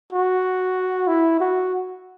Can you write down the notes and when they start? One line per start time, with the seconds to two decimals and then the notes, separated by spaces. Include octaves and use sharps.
0.13 F#4
1.07 E4
1.40 F#4